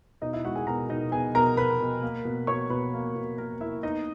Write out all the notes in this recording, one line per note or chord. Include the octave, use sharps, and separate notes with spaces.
B2 D#4 D#5
E4 E5
G#3 F#4 F#5
G#4 G#5
B2 A#4 A#5
B2 D#4 D#5
B3 G#4 G#5
B2 A#4 A#5
B2 B4 B5
B2
A#3
B2
B2 C#5 C#6
B2 B4 B5
A#3
B2
A#3 A#4 A#5
A#3 E4 E5
B3 D#4 D#5